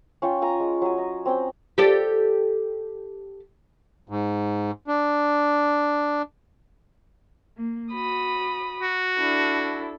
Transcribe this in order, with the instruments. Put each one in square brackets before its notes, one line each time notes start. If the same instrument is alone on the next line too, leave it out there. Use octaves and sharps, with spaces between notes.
[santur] C#4 F4 C#5 G5
F4 G#5 A#5
G#3
F#3 G#5
D#5
C4 C#4 G5
[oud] G4 A4 D5
[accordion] G#2
D4
[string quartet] A#3
F#4 B5 D#6
[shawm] F#4
[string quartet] D4 E4 A4